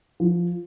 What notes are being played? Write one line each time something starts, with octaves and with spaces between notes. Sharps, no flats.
F3